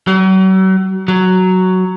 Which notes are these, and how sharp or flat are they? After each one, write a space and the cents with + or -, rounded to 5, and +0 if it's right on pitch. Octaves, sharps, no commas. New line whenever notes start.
F#3 +40
F#3 +5